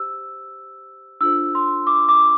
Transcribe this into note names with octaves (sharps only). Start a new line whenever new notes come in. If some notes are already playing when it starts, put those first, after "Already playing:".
Already playing: G4 C5 E6
D4 F4 A4 C5 E6
C6
D6
D6